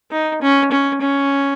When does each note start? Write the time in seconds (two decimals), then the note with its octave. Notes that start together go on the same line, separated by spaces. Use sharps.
0.11 D#4
0.42 C#4
0.71 C#4
1.02 C#4